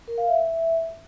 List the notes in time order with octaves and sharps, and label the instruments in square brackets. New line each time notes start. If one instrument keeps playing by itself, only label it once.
[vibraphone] A#4
F5
E5